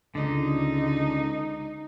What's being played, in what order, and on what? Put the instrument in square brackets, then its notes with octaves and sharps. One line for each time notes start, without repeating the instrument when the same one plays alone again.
[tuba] C#2 [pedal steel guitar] D3 [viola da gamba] D#4